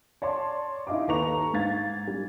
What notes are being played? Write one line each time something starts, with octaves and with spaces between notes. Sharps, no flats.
C#5 D5 A5 C6
D#4 E4 D#5 F5 D6
D#2 A4 B4 A#5 C#6 F7
G#2 F5 G#6 A6
G3